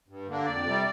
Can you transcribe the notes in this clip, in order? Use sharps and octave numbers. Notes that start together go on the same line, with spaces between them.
G2
D3 A#3 D4
F2 D5
C3 G3